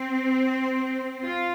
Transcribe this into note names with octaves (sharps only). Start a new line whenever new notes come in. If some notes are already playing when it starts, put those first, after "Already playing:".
Already playing: C4
F4